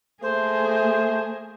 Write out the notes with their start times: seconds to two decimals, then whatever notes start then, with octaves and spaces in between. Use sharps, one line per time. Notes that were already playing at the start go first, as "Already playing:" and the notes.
0.22 A3 A#3 G#4 C5